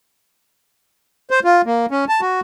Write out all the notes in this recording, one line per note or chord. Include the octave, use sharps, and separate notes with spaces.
C5
F4
A#3
C#4
A5
F#4